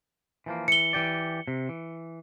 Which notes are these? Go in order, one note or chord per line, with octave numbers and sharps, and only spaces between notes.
E3 F3 A#3
E3 C#7 G7
E3 G4 D5
C3
E3